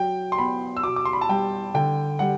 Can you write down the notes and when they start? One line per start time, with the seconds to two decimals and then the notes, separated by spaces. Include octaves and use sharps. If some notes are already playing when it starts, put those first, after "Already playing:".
Already playing: F#3 G5
0.32 C6
0.38 B3 B5
0.77 E6
0.83 B2 D6
0.96 D6
1.05 C6
1.13 B5
1.21 A5
1.29 G3 G5
1.74 D3 G5
2.19 G3 F#5